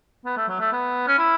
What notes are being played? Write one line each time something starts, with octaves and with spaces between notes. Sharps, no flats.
B3
A3
F#3
A3
B3
C#4
E4